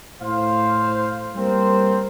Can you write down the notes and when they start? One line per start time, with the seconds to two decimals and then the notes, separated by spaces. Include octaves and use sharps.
0.22 A2 C5 F5
1.36 G3 A#3 C4 A#4 C5